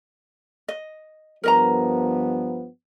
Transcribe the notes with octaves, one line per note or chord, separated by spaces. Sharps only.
D#5
G2 F3 B3 A#4 D#5 A#5